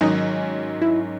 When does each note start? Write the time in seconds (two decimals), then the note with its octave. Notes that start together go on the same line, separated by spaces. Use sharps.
0.01 G#2 D#3 F#3 C#4 D#4
0.82 E4